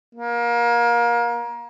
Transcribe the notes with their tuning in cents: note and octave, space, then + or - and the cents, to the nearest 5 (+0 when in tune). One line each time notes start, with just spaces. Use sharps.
A#3 +25